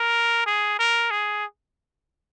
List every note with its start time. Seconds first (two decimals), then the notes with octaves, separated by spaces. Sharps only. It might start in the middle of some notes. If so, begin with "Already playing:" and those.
Already playing: A#4
0.46 G#4
0.79 A#4
1.11 G#4